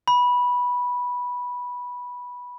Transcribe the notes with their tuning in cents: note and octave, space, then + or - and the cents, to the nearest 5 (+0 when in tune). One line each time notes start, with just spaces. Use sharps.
B5 -10